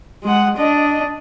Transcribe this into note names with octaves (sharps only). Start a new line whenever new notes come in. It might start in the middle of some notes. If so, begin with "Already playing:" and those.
G#3 F#5
D4 D#5